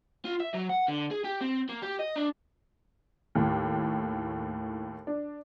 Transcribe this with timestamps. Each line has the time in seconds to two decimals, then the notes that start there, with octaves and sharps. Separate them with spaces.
0.25 F4
0.40 E5
0.54 F#3
0.69 F#5
0.88 D3
1.11 G#4
1.24 G4
1.41 C4
1.69 A#3
1.82 G4
1.99 D#5
2.16 D4
3.35 D#2 A2
5.07 D4